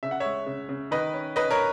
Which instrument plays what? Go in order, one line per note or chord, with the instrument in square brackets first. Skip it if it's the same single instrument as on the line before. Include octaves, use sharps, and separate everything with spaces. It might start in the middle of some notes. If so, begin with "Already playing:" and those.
[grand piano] C#3 E5
F#5
G#3 C#5 E5
C#3
C#3
D#3 B4 D#5
C#4
C#4 B4 D#5
A#4 C#5